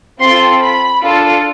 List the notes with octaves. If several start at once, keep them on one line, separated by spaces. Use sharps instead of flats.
C4 F4 A4 C6
B5
D4 F4 A4